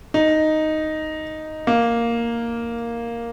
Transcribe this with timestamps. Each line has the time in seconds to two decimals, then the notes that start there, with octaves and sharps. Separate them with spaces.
0.14 D#4
1.67 A#3